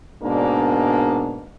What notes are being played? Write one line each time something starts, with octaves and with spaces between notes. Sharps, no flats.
G#2 B2 A#3 D4